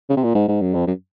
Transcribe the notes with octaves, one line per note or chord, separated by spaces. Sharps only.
C#3
C3
A#2
G#2
G#2
F#2
F2
F#2